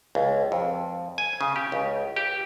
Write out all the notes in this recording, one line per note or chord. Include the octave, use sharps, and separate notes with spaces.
C#2
F2
G#5
C#3
G4
C#2
G4